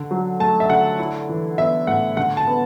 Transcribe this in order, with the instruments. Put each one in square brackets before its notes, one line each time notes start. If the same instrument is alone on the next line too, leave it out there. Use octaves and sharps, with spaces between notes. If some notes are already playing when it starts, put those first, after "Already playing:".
Already playing: [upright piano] D3
F#3
A3 A5
E5
D3 F#5
E4
E3
B3 E5
A2 F#5
D3 F#5
A5
B3